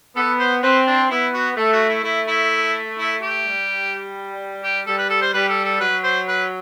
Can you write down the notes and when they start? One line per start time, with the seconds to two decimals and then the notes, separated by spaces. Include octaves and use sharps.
0.16 B3 A4
0.39 C5
0.63 C4 B4
0.87 D4
1.10 B3 E4
1.34 F#4
1.57 A3 A4
1.73 F#4
1.89 E4
2.04 A3 E4
2.28 E4
2.98 E4
3.22 G4
3.45 G3
4.63 G4
4.86 G3 A4
4.98 B4
5.10 A4
5.22 C5
5.34 G3 B4
5.49 A4
5.65 A4
5.80 F#3 B4
6.04 C5
6.28 B4